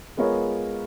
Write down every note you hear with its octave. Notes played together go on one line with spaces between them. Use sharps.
G#3 B3 F4 A#4 C#5